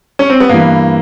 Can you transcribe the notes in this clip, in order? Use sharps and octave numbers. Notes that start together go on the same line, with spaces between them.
C#4
C4
B3
G2 E3 A#3